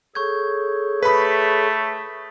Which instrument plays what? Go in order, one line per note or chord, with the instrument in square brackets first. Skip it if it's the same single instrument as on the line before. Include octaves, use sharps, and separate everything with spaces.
[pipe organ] G#4 A4 C#5 [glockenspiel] C#6 G6 G#6
[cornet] A3 [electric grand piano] B4 B5 [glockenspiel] D#6 B6